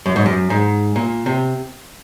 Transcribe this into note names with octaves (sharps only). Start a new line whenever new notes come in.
F#2
G#2
F#2
G#2
A#2
C3